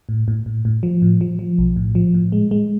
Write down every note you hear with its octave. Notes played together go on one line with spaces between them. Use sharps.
A2
A2
A2
A2
F3
A2
F3
F3
B1
A2
F3
A2
G#3
G#3